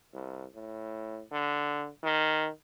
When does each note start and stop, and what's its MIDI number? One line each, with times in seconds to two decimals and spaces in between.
0.13 0.45 36
0.55 1.22 45
1.32 1.90 50
2.03 2.49 51